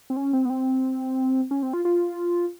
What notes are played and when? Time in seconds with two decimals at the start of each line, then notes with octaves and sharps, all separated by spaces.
0.10 C4
0.16 C#4
0.33 C4
0.45 B3
0.50 C4
1.51 C#4
1.63 C4
1.73 F4
1.85 F4